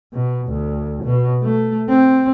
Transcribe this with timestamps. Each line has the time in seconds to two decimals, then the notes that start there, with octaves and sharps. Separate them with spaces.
0.13 B2
0.48 D2
1.04 B2
1.42 A3
1.89 C4